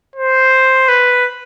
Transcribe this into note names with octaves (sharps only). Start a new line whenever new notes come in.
C5
B4